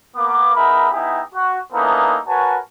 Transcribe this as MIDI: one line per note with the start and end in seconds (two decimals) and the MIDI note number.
0.16 0.55 58
0.16 0.55 59
0.16 0.55 86
0.55 0.89 59
0.55 0.89 63
0.55 0.89 68
0.55 0.89 70
0.55 0.89 76
0.55 0.89 83
0.92 1.20 59
0.92 1.20 63
0.92 1.20 64
0.92 1.20 67
0.92 1.20 68
1.33 1.58 66
1.73 2.18 58
1.73 2.18 59
1.73 2.18 61
1.73 2.18 63
1.73 2.18 64
1.73 2.18 69
2.28 2.57 66
2.28 2.57 70
2.28 2.57 71
2.28 2.57 73
2.28 2.57 80
2.28 2.57 81